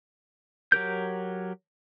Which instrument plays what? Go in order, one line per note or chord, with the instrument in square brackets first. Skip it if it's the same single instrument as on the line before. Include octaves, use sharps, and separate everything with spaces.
[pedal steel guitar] F#3 G4 A#4 G6